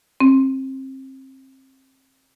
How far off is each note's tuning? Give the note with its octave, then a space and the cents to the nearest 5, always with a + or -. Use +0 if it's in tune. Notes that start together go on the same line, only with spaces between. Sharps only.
C4 +30